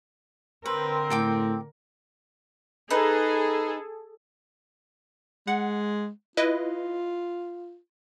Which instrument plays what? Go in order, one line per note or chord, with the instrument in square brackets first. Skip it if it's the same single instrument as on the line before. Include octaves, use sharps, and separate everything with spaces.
[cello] D3 A#4 [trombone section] C4 [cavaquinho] B4
[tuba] A2 [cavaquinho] A4 G5 D6
[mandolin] D#4 B4 [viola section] G#4 A4
[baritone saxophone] G#3 [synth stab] F#5
[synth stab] E4 B4 D#5 [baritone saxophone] F4